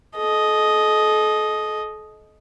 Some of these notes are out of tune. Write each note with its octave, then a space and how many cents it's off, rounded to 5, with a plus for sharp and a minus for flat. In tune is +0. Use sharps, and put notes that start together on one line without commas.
A4 -40 D#5 +0